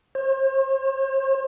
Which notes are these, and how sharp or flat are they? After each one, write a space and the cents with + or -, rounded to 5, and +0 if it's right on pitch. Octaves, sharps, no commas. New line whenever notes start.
C5 +45